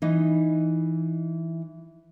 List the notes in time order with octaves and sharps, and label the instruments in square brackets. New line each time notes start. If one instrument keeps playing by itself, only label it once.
[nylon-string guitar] E3 D#4 D#5